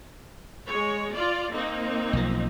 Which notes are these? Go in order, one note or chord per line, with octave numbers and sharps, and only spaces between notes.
G#3 C#5
F4 D5
A#3 C4 D#4
B1 F3